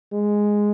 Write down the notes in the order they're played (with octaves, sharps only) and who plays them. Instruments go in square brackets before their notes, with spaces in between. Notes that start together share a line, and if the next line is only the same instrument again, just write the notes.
[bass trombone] G#3